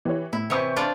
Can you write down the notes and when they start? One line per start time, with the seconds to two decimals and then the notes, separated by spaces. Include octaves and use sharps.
0.05 E3 G4 C#5
0.33 A2 E4
0.50 C3 E3 C#5 E5 C#6 G6
0.76 D4 F4 D5